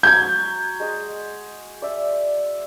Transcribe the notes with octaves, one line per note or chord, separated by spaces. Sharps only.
F#3 F#4 G6 G#6
G#3 D#5 C6
D5 E5